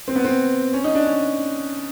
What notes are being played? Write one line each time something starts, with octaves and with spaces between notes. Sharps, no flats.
C4
B3
C4
C#4
D#4
D4
C#4